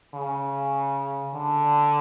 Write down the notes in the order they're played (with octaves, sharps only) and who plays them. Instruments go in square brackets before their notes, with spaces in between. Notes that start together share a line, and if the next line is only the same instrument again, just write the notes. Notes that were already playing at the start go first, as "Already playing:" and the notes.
[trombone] C#3
D3